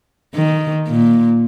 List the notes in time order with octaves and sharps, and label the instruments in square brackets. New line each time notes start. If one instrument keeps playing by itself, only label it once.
[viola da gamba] D#3
A#2